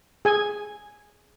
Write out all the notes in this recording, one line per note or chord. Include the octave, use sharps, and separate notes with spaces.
G#4 G#5